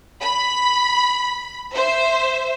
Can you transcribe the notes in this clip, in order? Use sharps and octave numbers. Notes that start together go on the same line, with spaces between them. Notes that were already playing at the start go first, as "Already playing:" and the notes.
B5
C5 E5